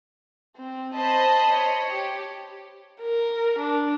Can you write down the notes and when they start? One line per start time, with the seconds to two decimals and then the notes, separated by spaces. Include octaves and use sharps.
0.57 C4
0.95 C5 D#5 A5 B5
1.54 C#5
1.92 G4
3.01 A#4
3.59 D4